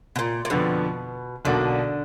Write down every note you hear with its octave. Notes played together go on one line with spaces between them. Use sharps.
B2
A#2
A#2
F2 B2 D3 F3 B3
B1 B2 D3 A#3 D4 F#4